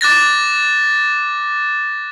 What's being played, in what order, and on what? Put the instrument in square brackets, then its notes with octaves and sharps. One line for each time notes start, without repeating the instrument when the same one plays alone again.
[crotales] D6 F#6 A6 A#6